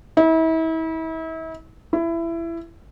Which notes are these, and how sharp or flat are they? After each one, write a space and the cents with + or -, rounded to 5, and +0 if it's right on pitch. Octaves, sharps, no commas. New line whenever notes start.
E4 -35
E4 +20